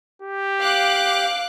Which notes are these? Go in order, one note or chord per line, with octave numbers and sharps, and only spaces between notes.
G4
F5 D6 F#6